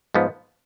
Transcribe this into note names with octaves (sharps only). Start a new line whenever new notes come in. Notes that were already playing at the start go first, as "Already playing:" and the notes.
G#2 F3 B3